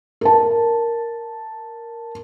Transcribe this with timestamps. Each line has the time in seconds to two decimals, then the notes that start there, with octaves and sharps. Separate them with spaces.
0.21 A#4 A5